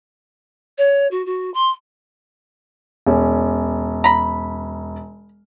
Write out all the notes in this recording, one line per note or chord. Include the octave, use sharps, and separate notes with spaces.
C#5
F#4
F#4
C6
E1 C#4
A#5 B5